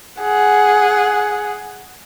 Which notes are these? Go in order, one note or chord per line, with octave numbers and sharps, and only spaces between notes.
G#4 F#5